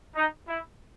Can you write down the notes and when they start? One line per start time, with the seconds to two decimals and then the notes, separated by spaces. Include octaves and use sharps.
0.15 D#4
0.48 E4